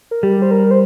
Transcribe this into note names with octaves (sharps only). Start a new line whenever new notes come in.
A#4
G3 G4
C5
A#4
C5